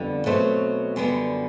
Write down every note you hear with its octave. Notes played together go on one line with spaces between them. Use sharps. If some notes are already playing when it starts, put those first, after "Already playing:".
Already playing: F2 D3 G3 B3
B2 F#3 A3 C4
F#2 D3 G3 B3